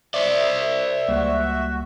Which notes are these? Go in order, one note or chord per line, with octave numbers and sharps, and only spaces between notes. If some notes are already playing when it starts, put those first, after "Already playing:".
C5 D5 E5
C#2 G3 A#3 F#4